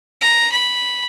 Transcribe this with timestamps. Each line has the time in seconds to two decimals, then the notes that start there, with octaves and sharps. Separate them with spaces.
0.22 A#5
0.52 B5